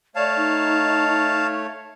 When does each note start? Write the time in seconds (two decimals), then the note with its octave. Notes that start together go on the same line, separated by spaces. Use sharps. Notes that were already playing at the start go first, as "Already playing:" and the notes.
0.16 A3 C#5 D5 F5 A5
0.36 D#4